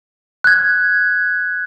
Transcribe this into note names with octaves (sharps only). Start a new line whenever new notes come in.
F#6 G#6